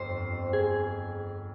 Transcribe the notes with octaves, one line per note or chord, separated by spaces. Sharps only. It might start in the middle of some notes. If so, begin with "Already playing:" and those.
Already playing: G1 F2 C5
G#4